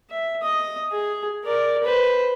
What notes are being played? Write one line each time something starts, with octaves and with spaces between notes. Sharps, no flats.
E5
D#5 D#6
G#4
A#4 D5
B4 C5